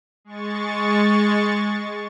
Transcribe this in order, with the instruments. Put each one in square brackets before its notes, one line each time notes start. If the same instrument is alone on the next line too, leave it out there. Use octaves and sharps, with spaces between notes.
[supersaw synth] G#3 C#6 A6